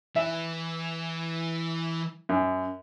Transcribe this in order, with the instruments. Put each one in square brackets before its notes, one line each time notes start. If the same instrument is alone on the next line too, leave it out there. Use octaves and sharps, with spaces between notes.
[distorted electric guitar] E3 [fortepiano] E5
[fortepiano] F#2